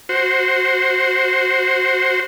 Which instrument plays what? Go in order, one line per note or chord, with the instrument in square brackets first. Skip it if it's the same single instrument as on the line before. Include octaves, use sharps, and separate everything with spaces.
[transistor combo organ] F#4 C5